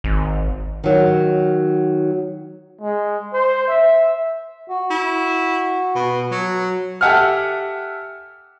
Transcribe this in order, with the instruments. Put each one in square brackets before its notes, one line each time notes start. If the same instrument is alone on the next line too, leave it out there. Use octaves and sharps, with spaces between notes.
[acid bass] G#1
[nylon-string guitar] D#3 F#3
[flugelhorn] G#3
C5
E5
[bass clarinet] F#4
[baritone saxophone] E4
B2
F#3
[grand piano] G4 A4 E5 F#5 G#5 F6